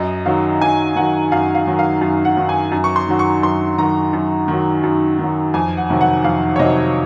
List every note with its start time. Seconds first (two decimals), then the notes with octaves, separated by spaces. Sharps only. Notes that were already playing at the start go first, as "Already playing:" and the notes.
Already playing: F#2 D#5
0.26 D#3 F#3 F5
0.61 F#2 G#5
0.96 D#3 F#3 F#5
1.32 F#2 F5
1.55 F5
1.67 D#3 F#3
1.79 F5
2.01 F#2
2.25 F#5
2.37 D#3 F#3
2.49 G#5
2.72 F#2
2.84 C#6
2.96 C6
3.07 D#3 F#3
3.19 C#6
3.42 F#2 C6
3.78 D#3 F#3 A#5
4.13 F#2
4.48 D#3 F#3
4.83 F#2
5.18 D#3
5.23 F#3
5.54 F2 G#5
5.77 F#5
5.90 C3 D#3 F#3
6.01 F#5
6.24 F2 F5
6.56 C#5
6.59 C3 D#3 F#3 D#5